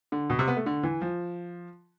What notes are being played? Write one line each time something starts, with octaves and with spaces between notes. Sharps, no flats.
D3
B2
C3
B3
A3
D3
E3
F3